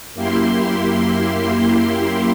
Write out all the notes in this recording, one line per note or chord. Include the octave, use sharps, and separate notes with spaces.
F#2 A#3 E4 G4 C6